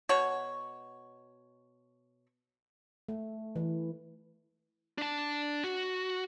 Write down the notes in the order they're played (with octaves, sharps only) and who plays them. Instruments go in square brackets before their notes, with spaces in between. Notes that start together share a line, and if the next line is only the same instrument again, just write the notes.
[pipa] B2 F#4 C#5
[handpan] A3
E3
[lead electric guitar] D4 A5
F#4